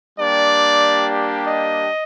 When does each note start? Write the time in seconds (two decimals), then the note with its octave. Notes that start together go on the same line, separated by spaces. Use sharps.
0.17 G3 A#3 D4 G4 D5
1.46 D#5